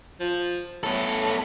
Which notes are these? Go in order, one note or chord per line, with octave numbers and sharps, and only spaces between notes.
F3
A2 B3 A4